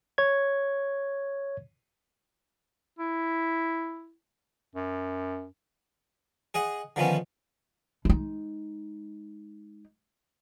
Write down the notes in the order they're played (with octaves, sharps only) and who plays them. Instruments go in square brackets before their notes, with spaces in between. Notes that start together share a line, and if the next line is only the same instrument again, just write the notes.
[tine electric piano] C#5 G#6
[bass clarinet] E4
F#2
[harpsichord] G#4 D#5 F#5
D3 D#3 F3 B3 C#4
[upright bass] G#3 D#4